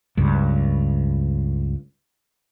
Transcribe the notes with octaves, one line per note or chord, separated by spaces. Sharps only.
C#2 G2